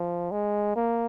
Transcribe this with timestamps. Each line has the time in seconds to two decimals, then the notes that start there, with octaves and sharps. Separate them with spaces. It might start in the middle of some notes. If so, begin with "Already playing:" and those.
Already playing: F3
0.32 G#3
0.76 A#3